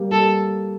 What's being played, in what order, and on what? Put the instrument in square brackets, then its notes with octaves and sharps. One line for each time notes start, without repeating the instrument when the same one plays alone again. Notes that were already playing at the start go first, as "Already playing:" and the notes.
Already playing: [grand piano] G3 A#3
[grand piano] G3 [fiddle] A4